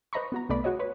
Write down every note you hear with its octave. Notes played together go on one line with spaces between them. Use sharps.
B4 C5 D#5 A#5 B5 C#6
B3 F#4 A#5
C2 A3 B3 D5 B5
F#4 G#4 C#5 D#5
B4 C#5